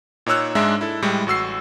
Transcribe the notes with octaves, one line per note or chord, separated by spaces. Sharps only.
A#2 D#4 C#5 E6 F#6
G#2 G#3 D4 E5
E4 A4
A2 G3 G#3
A1 F#4 E6 C7